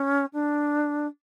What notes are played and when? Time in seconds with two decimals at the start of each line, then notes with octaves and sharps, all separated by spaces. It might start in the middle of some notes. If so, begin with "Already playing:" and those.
Already playing: C#4
0.33 D4